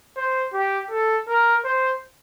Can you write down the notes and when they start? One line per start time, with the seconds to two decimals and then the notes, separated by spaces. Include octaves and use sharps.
0.17 C5
0.54 G4
0.91 A4
1.29 A#4
1.65 C5